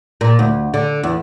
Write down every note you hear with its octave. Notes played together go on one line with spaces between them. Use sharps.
A#2
D2
D3
E2